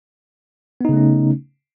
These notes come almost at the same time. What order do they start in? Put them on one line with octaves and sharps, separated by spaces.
B3 D#4 C#3 A3 C#4